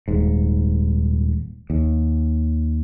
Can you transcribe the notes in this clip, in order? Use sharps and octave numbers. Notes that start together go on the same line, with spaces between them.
D#1 G#2
D#2